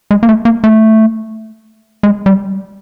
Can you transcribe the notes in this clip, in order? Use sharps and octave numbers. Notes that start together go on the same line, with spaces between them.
G#3
A#3
A3
A#3
A3
G#3
G3